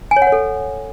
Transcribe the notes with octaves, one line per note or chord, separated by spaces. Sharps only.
G#5
C#5
F#5
C#5
A4